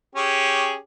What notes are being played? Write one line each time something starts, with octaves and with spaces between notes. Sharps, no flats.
C#4 G4 G#4